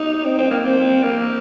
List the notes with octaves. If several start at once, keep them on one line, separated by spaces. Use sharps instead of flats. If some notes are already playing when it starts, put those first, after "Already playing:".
Already playing: D#4
C4
C4
A#3
C4
A#3